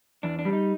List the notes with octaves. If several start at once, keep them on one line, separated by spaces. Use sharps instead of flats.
E2 D4
D4
G3
D#4